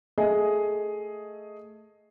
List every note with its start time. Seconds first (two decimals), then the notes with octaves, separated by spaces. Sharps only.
0.18 A3 G#4 D#5 E5